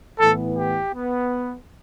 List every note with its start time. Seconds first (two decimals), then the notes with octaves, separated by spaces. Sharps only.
0.19 A2 E3 B3 A4
0.57 G4
0.93 B3